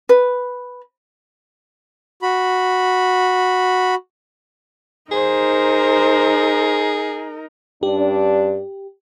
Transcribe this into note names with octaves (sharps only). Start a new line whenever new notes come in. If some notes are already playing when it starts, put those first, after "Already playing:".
B4
F#4 B5
D#4 G#4 A#4 C5
G2 C#4 D4 G4